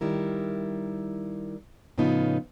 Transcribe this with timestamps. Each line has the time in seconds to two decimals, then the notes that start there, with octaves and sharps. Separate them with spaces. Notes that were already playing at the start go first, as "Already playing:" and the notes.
0.01 D#3 G3 E4 A#4
1.98 A2 C#3 F3 B3 D#4 F4